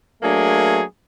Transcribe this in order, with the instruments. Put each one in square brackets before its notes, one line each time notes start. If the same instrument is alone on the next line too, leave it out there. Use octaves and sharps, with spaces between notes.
[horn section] F#3 A3 A#3 D4 G#4